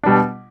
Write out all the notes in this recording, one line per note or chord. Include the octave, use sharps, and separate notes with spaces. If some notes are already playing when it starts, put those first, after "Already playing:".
B2 G3 D4